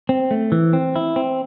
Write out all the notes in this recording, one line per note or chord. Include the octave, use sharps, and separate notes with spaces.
C4
A3
E3
C4
E4
C4